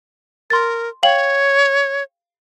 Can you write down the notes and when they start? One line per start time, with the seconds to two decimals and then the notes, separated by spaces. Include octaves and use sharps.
0.50 A#4 C6 A6
1.03 C#5 F5 G5 F#7